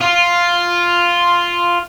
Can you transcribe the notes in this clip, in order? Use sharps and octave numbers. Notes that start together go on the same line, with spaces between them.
F4